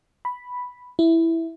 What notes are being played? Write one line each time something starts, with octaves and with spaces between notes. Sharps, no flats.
B5
E4